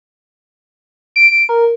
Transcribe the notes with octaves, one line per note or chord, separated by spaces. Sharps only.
D7
A#4